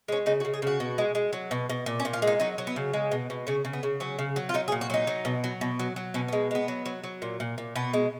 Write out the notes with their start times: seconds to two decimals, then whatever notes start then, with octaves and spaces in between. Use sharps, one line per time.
0.08 G#3 C#4
0.26 C#3 D#4
0.40 F#4
0.45 C#3
0.54 G#4
0.62 C#3 F#4
0.80 B2
0.98 G#3
1.15 G#3
1.33 F#3
1.51 B2
1.69 B2
1.86 A#2
2.00 C#4
2.05 A#2
2.13 F4
2.22 G#3
2.27 D#4
2.40 F#3 D#4
2.58 F#3
2.67 B3
2.76 C#3
2.93 G#3
3.11 B2
3.30 B2
3.47 C#3 C#4
3.65 C#3
3.73 B3
3.83 C#3
4.00 F#3 C#4
4.19 C#3
4.36 F#3
4.49 F4
4.54 F#3 D#4
4.68 G#4
4.72 A#2
4.81 F#4
4.90 F#3 D#4
5.07 F#3
5.25 B2
5.44 F#3
5.61 B2
5.79 F#3
5.96 F#3
6.14 B2 C#4
6.28 B3
6.32 G#3
6.51 G#3 B3
6.68 F#3
6.86 F#3
7.04 F#3
7.22 A#2
7.40 A#2
7.58 A#2
7.76 B2 B3
7.93 G#3